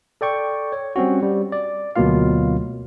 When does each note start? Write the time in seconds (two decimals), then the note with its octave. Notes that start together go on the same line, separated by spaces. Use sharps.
0.21 A4 D5 G5 C#6
0.72 C#5
0.96 G3 C4 C#4 F#4
1.23 G3
1.52 D5
1.96 D2 B2 F#3 A#3 F4 F5